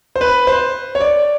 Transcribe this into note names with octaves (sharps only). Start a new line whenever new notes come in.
C5
B4
C5
C#5
D5